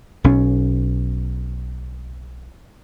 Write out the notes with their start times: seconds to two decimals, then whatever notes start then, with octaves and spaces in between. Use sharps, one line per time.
0.24 B1 C#4